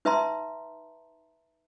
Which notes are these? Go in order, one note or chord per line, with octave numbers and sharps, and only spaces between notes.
D#4 B4 E5 A5 A#5 C6